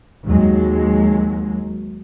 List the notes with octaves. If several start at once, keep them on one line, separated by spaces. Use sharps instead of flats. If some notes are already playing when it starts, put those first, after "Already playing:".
D#2 F#3 G#3